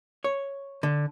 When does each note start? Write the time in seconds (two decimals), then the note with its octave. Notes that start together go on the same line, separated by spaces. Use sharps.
0.24 C#5
0.83 D3